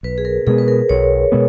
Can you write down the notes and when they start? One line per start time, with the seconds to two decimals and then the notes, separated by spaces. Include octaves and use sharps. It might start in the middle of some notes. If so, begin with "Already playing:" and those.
0.03 B1 B4
0.18 G#4
0.25 A#4
0.47 B2 G#3 B3 G#4
0.58 B4
0.68 A#4
0.89 B1 C#5
1.32 B2 G#3 B3